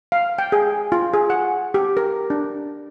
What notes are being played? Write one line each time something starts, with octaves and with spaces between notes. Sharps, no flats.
F5
G5
G#4
F4
G#4
F#5
G4
A#4
D4